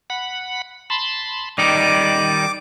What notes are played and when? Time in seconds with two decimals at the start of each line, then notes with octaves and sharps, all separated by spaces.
0.10 F#5 B5
0.90 A5 B5 C6
1.58 D#3 G3 D#4 D5 D6